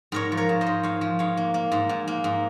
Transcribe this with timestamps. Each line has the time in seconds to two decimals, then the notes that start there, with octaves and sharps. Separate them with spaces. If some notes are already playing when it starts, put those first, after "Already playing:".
0.12 G#2 A#4 C#5
0.32 F3
0.37 A#4 C#5
0.49 G#2
0.61 C5 D#5
0.66 G#2
0.83 G#2 C#5 F5
1.01 F3
1.19 G#2 C#5 F5
1.37 A#3
1.54 A#3
1.72 G#2
1.89 G#2
2.08 A#3
2.24 G#2